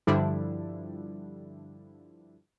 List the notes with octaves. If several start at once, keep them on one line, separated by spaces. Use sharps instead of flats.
G2 D3 F3 G3 D4 E4